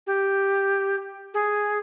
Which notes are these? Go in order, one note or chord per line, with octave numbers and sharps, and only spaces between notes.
G4
G#4